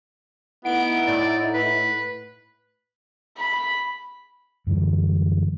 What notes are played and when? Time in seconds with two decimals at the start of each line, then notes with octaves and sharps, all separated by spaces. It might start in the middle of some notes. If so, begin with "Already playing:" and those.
0.65 A3 B3 D#4 E4 F#5 D7
1.07 A2 D5
1.54 B4
3.37 B5
4.67 F#2 D3 E3 G3